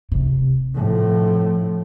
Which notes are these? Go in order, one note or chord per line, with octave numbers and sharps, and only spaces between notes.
C3
A2 F3